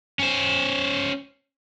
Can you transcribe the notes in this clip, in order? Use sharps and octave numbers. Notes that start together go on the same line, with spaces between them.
C#4 C5